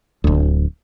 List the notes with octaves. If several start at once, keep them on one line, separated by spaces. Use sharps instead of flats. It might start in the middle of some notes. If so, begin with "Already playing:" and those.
D1 D2